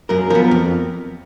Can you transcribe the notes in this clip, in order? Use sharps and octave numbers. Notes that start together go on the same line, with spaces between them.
F#2 A#4
F3 B3 A#4
F2